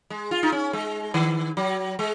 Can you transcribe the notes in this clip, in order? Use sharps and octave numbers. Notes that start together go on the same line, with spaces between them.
G#3
F4
D#4
C#4
G#3
D#3
F#3
G#3